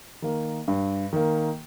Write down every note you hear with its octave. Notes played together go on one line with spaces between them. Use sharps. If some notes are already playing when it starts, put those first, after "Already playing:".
D#3 A#3
G2
D#3 A#3